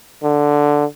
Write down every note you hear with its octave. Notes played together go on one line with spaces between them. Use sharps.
D3